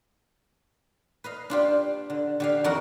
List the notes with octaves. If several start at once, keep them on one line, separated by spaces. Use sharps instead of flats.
B4 D#5 F5
D4 F4 G4
D3
D3 G4 F5
F2 D#3 D#4 F#4 A#4 F#5